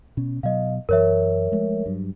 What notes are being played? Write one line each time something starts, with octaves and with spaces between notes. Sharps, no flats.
B2 C#4
B2 F#3 D#5 F5
F#2 E3 A#4 C#5 E5
F3 G#3 A3
G2 F#3